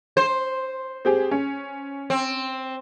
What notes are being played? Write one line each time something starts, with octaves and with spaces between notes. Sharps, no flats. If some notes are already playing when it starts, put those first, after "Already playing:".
C5 C6
C4 G4 G#4
C#4
C4